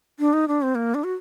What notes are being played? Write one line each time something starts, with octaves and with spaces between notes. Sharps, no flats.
D4
D#4
D4
C4
A#3
D4
F#4